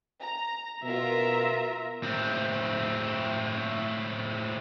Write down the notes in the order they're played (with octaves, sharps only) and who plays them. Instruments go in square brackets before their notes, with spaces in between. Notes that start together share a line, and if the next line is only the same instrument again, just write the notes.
[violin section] A#5
[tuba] B2 [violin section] F4 A#4 [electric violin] E5 A#5
[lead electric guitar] A2 C4